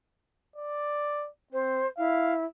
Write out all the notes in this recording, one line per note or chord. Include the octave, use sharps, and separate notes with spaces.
D5
C4 C5
E4 F5